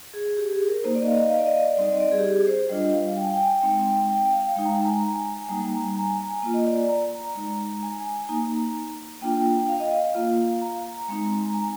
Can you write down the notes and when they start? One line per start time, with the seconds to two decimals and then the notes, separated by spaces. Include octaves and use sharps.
0.14 G#4
0.37 G4
0.53 G#4
0.68 A#4
0.84 A#3 D#4 C5
0.95 D5
1.02 D#5
1.08 F5
1.19 D#5
1.30 F5
1.38 D5
1.46 D#5
1.61 D5
1.77 G3 C4 D#4 D5
1.88 D#5
2.00 D5
2.12 G#4
2.18 G4
2.24 G#4
2.47 C5
2.70 G3 D4 F4 D#5
2.93 F5
3.16 G5
3.24 G#5
3.33 G5
3.63 G#3 C4 D#4
4.10 G5
4.33 F5
4.56 G#3 D#4 G5
4.65 A#5
4.72 G#5
4.87 A#5
5.03 G#5
5.49 G3 A#3 D#4 A#5
5.73 G#5
5.90 G#5
5.96 A#5
6.19 G#5
6.43 A#3 F4
6.54 D#5
6.65 D5
6.78 D5
6.89 A#5
7.35 G#3 D#4
7.83 G#5
8.29 A#3 D#4 A#5
9.21 A#3 D4 F4 G5
9.69 F5
9.80 D#5
9.91 F5
10.15 A#3 F4
10.62 A#5
11.08 G#3 C4 D#4
11.43 A#5
11.54 G#5